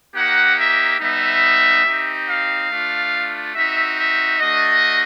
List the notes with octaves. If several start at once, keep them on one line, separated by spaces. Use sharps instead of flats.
A#3 D#4 G4 F#5
E5
G3 B3 D#4 E5
C4 D#4 G4
F5
A3 D4 F4
C4 D#4 F#4 E5
E5
A3 D4 F#4 D#5